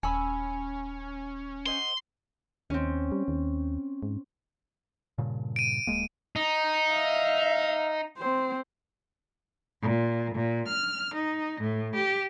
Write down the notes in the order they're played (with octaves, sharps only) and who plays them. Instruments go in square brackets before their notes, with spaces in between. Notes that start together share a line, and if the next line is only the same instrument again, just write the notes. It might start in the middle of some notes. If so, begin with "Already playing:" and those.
[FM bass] D#1 [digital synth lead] C#4 [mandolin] G#5 B5 E6
[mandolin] C5 D#5 F#5 [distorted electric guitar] C6
[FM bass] D#2 [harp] C4 C#4
[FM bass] G3
D#2
G#2
[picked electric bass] G2 A#2 C#3
[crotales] D7 D#7
[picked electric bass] D1 G#3 A#3
[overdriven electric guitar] D#4
[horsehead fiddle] E5 F5
C4 C5
[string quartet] A#2
A#2
F6
D#4
A2
G4